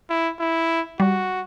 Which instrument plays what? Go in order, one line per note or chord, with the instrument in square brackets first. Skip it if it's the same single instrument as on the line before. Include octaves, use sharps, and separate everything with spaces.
[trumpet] E4
E4
[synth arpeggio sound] G3 [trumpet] F#4